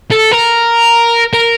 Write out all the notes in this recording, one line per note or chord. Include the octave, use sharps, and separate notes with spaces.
A4
A#4
A#4